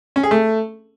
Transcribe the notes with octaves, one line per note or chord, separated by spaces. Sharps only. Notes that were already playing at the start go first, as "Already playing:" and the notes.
C#4
G#4
A3